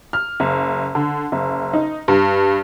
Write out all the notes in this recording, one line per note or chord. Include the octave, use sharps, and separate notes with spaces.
F6
F#1
D3
F#1
D#4
G2